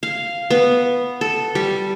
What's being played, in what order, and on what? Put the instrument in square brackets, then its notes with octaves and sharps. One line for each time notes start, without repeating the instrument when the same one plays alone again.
[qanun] F5
B3
A4
G3